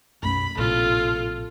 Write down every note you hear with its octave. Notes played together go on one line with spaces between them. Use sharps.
B1 F#2 A3 B5
A#1 A2 C3 F4 A4